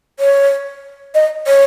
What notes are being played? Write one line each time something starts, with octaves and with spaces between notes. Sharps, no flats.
C#5
D#5
C#5